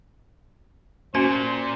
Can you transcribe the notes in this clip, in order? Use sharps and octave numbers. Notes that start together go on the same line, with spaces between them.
A#2 C#4 F#4 C5 G#5